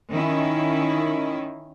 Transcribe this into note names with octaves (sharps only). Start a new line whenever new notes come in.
D#3 C#4 E4